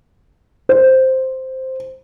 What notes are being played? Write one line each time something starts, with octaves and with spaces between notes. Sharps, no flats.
C5